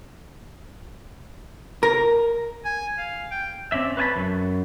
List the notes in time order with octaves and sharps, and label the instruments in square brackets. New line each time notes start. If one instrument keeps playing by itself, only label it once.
[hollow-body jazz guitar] A#4
[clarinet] G#5
F5
G5
[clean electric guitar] C4 C#4 D5 E5
B4 C#5 E5 G#5 A5 B5
F#2